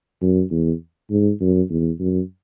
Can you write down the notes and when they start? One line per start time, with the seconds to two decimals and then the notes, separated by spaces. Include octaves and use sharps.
0.22 F#2
0.51 E2
1.10 G#2
1.41 F#2
1.70 E2
2.00 F#2